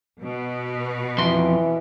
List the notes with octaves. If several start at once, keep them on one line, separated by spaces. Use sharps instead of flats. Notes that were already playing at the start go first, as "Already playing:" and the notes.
B2 B3
F2 E3 C6